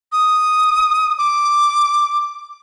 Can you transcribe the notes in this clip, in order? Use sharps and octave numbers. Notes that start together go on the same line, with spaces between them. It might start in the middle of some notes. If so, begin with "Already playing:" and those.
D#6
D6